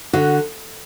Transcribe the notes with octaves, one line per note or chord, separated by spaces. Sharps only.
D3 F#4